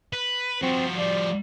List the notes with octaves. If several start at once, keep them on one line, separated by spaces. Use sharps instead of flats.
B4
F3 C4 F#4
F3 G3 D5